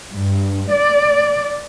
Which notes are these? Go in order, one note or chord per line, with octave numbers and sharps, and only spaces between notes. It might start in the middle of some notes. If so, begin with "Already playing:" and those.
G2
D5